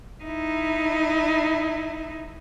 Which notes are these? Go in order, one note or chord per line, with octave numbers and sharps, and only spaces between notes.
D#4 E4